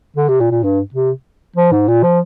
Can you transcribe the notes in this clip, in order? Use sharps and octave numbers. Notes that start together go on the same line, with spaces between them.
D3
C3
A#2
A#2
G2
C3
F3
G#2
A#2
F3